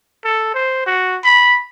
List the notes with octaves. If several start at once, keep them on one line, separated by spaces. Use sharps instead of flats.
A4
C5
F#4
B5